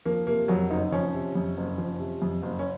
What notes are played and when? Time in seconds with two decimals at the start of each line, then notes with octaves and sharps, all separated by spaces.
0.06 F3 A#3
0.27 C3 A#3
0.48 F2 F#3
0.70 F#1 D#4
0.92 F3 C#4
1.14 C3
1.35 F2
1.57 F#1
1.78 F3
1.99 C3
2.22 F2
2.43 F#1
2.59 C#4